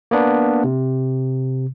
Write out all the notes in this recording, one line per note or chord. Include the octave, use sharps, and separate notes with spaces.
A#3 B3 D4
C3